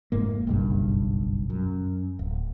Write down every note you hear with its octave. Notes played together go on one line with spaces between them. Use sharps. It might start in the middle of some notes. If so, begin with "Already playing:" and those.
F1 G#2 A#3
F#1 B1 G2
F#2
D1